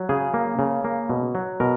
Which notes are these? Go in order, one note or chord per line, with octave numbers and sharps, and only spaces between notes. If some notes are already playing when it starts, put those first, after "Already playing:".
Already playing: F#3
C#3 G#4
A#3
C#3
A#3
B2
F#3
B2 A#4